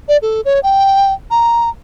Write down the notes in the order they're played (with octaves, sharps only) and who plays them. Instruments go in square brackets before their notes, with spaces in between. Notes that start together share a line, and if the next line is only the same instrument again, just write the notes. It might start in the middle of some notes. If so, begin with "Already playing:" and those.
[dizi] D5
A4
C#5
G5
A#5